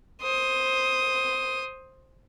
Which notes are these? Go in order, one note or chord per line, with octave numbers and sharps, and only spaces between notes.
C5 D#6